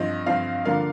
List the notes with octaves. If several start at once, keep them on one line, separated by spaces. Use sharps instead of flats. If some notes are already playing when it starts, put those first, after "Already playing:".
Already playing: G2 F3 C4 D#5
G2 F3 C4 F5
D3 F3 A#3 F5